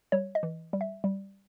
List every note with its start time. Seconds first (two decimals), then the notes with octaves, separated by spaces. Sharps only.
0.12 G3 C#5
0.35 D#5
0.43 E3
0.73 G3
0.81 E5
1.04 G3